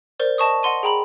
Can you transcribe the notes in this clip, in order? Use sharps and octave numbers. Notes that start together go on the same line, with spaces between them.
A#4 C5 D5
D#5 A5 C#6 D#6
D#5 F#5 C6 D#7
G#4 G5 A#5 B5 F#7